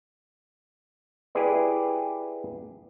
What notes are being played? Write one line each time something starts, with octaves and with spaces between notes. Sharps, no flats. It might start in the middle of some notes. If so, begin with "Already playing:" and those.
E4 G4 G#4 B4 D5